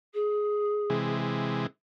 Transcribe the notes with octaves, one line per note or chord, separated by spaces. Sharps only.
G#4
C3 E3 G#3